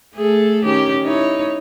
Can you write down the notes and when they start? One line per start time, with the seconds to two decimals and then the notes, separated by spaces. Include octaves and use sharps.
0.14 A3 G#4 A4
0.65 D#3 C#4 G4
1.04 D#4 E4 C#5